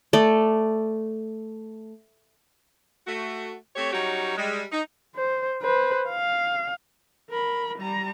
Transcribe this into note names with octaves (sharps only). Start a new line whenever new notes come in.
A3 D5
A3 F#4
A3 C4 G4 C#5
F#3 G3 C#4 D#4 F#4 G4
G3 G#3
D#4
C5
B4 C5
F5
A#4 B5
G3 A#5